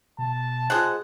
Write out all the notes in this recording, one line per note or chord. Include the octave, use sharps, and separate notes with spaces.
B2 A5
G#3 C4 F4 G#4 D#5 F#5